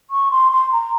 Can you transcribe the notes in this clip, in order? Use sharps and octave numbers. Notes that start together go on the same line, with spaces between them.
C#6
C6
C6
A#5